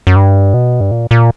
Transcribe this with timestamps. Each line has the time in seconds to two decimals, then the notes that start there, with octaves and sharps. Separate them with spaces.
0.07 F#2
0.16 G2
0.54 B2
0.80 G2
0.91 A#2
1.11 A#2